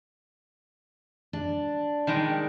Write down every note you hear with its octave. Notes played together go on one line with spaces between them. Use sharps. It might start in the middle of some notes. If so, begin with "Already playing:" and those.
D4
D#3 G3 G#3